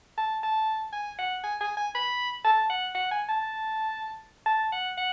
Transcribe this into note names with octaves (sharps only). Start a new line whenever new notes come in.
A5
A5
G#5
F#5
G#5
G#5
G#5
B5
A5
F#5
F#5
G#5
A5
A5
F#5
F#5